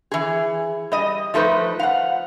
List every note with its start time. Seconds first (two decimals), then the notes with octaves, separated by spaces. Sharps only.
0.12 E3 G#4
0.92 G3 D#5
1.34 F3 A3 D#4 B4 C5
1.79 F5 F#5